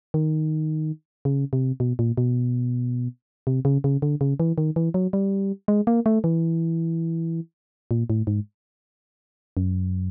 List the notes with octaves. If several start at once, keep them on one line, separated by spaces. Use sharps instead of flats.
D#3
C#3
C3
B2
A#2
B2
C3
C#3
C#3
D3
C#3
E3
D#3
E3
F#3
G3
G#3
A#3
A3
E3
A#2
A2
G#2
F#2